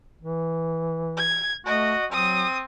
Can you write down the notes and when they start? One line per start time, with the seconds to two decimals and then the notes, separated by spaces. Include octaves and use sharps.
0.22 E3
1.17 G#6
1.66 A3 F#4 D#5
2.12 F#3 C4 D#6